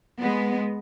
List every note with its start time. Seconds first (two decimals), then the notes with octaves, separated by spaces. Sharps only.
0.18 G#3 B3